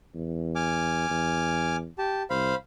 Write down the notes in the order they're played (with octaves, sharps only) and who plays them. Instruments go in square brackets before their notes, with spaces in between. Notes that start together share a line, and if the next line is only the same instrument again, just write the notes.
[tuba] E2
[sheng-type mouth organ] G#5 D6 F6
[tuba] E2
[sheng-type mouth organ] G4 A5
[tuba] C2 [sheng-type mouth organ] C5 F5 B5